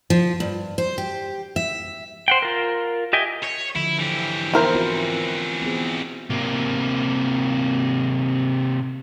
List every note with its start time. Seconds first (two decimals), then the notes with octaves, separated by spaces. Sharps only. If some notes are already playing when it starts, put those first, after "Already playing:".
0.10 F3
0.40 G2
0.78 C5
0.98 G4
1.56 E5
2.28 C5 F#5 G5
2.42 F4 A#4
3.13 G4 D#5 E5 G5 G#5
3.43 C#5
3.76 D3 F3 E4
3.99 E3 G4
4.53 B3 E4 A#4 C5
4.75 C4 F4 F#4
5.61 B3 C4 G#4
6.30 C3 A#3